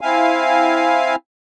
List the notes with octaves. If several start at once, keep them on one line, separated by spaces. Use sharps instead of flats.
C4 E4 F5 G#5